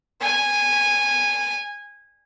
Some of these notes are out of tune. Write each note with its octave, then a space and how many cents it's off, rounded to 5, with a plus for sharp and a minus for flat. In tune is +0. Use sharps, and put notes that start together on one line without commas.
G#5 -15